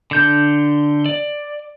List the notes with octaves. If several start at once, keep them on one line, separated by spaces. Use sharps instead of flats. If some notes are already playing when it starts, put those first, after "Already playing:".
D3 G6
D5